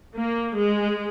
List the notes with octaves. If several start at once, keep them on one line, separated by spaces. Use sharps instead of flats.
A#3
G#3